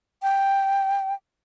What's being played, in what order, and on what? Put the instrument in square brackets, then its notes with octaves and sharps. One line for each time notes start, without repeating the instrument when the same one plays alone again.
[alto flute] G5